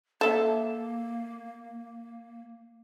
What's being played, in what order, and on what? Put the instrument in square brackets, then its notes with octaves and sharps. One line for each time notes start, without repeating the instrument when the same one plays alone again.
[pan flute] A#3 [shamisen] A4 E5